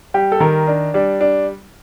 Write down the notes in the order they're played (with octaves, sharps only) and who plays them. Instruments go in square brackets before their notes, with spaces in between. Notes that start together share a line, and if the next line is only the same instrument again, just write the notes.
[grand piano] G3 G4
A4
D#3 A#4
D4
G3 D4
D4